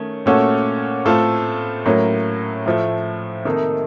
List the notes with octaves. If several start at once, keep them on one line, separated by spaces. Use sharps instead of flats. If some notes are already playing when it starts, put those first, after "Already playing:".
Already playing: D#3 A3 C#4
A#2 A3 C#4 F#4 A4
A2 A3 C4 F4 A4
A2 F#3 A#3 C#4
A2 F3 A3
C3 D#3 A#3 D#4 A4